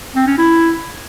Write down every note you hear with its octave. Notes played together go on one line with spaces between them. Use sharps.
C4
C#4
E4